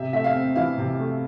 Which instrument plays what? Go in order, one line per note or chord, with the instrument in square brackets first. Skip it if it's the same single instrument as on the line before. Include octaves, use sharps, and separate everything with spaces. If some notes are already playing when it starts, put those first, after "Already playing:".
Already playing: [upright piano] C3 E5
A3 E5
F5
C4
E3 F5
C3
A3